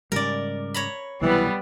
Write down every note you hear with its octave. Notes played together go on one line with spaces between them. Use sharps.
G#2 C#3 G3 A#4 D5
C#5 A#5 B5
C2 B2 E3 F#3 G3 B3